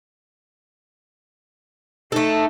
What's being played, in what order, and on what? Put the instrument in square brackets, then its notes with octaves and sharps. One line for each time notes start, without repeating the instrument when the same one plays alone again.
[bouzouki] A3 A4 [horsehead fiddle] D#4